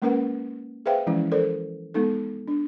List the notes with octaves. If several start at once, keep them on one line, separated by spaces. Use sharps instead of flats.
G#3 A#3 C#4 A#4 B4 F#5
G#4 B4 C5 E5 F5 G5
E3 F3 G#3 C#4 E4
A4 A#4 C5 D5
G#3 B3 D#4 A4
D4